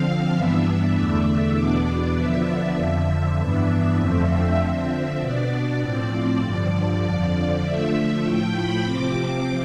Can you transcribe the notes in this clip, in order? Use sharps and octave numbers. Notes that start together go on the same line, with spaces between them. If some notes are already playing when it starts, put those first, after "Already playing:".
Already playing: D3 F3 C4 F5
G2 E3 B3 D4 E5
E2 D3 A3 D4
E2 B2 B3 D4 D5
D3 F3 B3 D4 E5
F2 D3 F3
G2 E3 B3 D4
F2 D3 F3 A3 C4
D3 F3 C4 E5
B2 B3 D4 D5
A2 F3 C4 D5
G2 D3 F3
F2 D3 F3 D5
D3 F3 A3 E5
A2 F3 A3 G5
B5
C3 F3 C4 D6